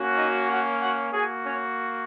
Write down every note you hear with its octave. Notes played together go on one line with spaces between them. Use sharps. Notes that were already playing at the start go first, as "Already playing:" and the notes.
Already playing: A#3 C#4 F#4
D#4 D#5
F#4 F#5
F#4 F#5
A#3 F#4 G#4 G#5
C#4 C#5